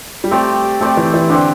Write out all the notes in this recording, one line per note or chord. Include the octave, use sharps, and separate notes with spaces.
G3
A3 C4 G4 D5
A3 C4 G4 D5
E3
E3
D3 C4 G4 D5